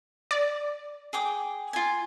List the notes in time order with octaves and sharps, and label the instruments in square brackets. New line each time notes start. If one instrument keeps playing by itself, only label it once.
[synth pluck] D5
[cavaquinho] G#4 G5 D6
F4 G#5